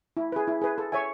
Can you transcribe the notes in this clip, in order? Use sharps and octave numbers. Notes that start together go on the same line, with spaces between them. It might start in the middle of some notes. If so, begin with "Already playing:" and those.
E4
G#4 B4
E4
G#4 B4
A4
C#5 E5 G#5